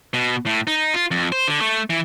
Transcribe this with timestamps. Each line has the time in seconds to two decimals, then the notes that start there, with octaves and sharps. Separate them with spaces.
0.14 B2
0.46 A2
0.67 D#4
0.94 F4
1.11 F2
1.32 C5
1.48 D3
1.61 A3
1.90 E3